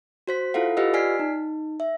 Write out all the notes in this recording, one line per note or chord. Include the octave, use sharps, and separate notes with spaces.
F#4 C5 B6
E4 F4 A4 F5 F#5
F4 G4 B4 D#5 F#5 E6
D5 G#5 F6 B6 C7
D#4
E5